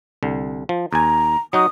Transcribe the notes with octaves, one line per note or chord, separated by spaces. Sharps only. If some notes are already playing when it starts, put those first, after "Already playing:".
C2 D3
F3
D#2 G#5 A#5
F#3 D#4 F#4 D#6